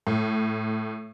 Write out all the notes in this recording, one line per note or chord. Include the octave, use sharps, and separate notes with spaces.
A2